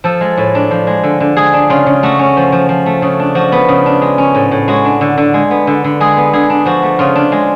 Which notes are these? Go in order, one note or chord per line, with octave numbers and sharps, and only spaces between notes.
F3 A4
G#3
A2
D4
F3
G#3
D3
D3
G#3 G#4
D4
C#3 F4
C#3
A3 F#4
C#4
F3
F3
F3
A3
C#3
D4
F3 F#4
B3
C#3
D4
G#3
C#4
A2
A2
G#3 F#4
D4
D3
D3
G#3
B3
D3
D3
G#3 G#4
B3
D3 G#4
D4
F3 F#4
A3
C#3 F4
D4
G#3